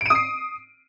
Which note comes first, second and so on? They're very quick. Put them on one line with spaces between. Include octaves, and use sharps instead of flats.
D7 D#7 D#6 C7